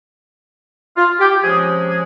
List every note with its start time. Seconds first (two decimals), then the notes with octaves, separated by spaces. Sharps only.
0.97 F4
1.20 G4
1.43 C3 F3 G#3 C#4 G#4
1.90 G#4